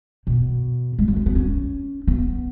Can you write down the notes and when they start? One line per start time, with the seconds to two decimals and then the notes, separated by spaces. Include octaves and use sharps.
0.27 B2
0.99 G#3
1.08 F#3
1.16 G#3
1.26 B3
1.35 C#4
2.07 B3